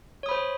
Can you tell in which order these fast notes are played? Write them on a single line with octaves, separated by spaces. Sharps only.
C#5 D#6 B5 C5